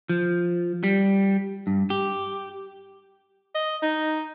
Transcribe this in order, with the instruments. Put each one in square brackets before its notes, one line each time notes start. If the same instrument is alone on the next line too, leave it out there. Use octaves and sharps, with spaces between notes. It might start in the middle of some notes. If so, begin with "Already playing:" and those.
[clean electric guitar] F3
G3
G2
G4
[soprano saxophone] D#5
D#4